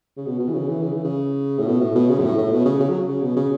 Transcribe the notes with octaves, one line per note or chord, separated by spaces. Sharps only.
C#3
B2
B2
E3
C#3
E3
C#3
E3
C#3
A2
B2
A2
B2
C#3
F#2
A2
A2
B2
C#3
C#3
F#3
C#3
B2
C#3